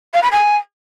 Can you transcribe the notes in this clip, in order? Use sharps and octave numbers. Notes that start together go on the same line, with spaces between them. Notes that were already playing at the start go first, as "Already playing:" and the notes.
F5
B5
G#5